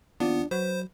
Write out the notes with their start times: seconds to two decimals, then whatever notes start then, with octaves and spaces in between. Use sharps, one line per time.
0.20 D#2 F3 B3 D4
0.51 F#3 B4 C5